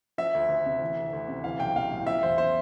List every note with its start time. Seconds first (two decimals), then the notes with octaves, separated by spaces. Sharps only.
0.18 F3 E5
0.35 D2
0.49 D2
0.66 C3
0.82 E3
0.96 D2
1.13 D2
1.29 C3
1.44 E3 F5
1.59 B1 G5
1.75 B1 F5
1.92 A2
2.07 F3 E5
2.23 E2 C5
2.38 C5